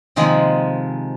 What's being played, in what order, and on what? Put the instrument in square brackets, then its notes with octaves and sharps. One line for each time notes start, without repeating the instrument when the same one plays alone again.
[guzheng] C3 D#3 F3 G#3 A#3